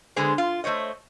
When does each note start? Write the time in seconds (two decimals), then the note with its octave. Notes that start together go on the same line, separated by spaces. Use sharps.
0.16 D3 G#3 B3 G#4 C5
0.38 F4
0.64 A3 C5 C#5 D#5